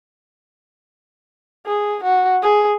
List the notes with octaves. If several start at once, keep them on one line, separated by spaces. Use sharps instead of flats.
G#4
F#4
G#4